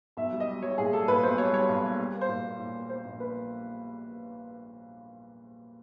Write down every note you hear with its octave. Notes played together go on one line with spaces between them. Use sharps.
B1 E5
G3
D#5
G3
G3 C#5
A#2 G#4
G3 A4
A#2 B4
B1 C5
G3 C#5
G3 C#5
B1
G3
G3
A#3
C5
A#2
A#3
A#2
A#3
A#3 C5
A#1
A#3 B4